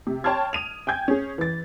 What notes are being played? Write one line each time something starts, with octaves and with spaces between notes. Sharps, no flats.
C3
C#5 G5 A5 C6 F6 G#6
D#6 D#7 F7
G5 G#5 G6 G#6
C#4 G#4
E3 A6